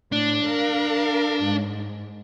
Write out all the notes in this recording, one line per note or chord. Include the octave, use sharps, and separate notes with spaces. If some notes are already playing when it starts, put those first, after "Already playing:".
A2 D4
A#4 F5
G#2